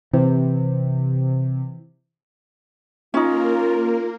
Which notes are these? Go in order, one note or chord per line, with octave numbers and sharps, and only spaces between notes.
C3 E3
A#3 C#4 D#4 F4 A#4